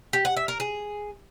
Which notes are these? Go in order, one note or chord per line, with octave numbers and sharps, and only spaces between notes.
G4
F#5
E5
A#4
G#4